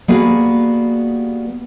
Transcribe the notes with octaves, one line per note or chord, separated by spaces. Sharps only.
G3 A#3 B3 F#4 G#4 B4